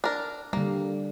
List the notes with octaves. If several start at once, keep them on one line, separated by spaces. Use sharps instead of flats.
D4 A#4
D3 G3 A#3